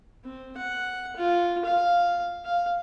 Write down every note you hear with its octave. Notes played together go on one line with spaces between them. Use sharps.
C4
F#5
F4
F5
F5